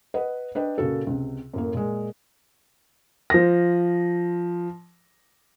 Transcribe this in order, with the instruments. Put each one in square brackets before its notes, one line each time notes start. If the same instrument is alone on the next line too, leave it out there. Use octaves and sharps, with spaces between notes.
[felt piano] B4 D#5 F#5
D4 B4 D#5 G5
A#2 C#3 F#4 A4
C#2 C3
F#2 A2 A#3
A#2 G#3
[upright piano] F3 A#6